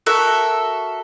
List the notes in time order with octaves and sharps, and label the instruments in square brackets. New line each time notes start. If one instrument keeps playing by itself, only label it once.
[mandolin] F#4 A4 A#4 E5